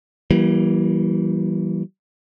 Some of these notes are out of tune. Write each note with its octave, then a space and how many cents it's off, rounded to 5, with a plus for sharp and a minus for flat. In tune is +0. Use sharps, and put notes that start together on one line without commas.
E3 +0 G3 -35 A#3 +30